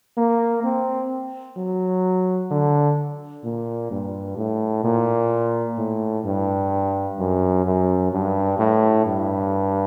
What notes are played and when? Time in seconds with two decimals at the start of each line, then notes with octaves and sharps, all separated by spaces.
0.17 A#3
0.64 C4
1.57 F#3
2.51 D3
3.44 A#2
3.91 G2
4.37 A2
4.84 A#2
5.78 A2
6.25 G2
7.19 F#2
7.66 F#2
8.12 G2
8.59 A2
9.06 G2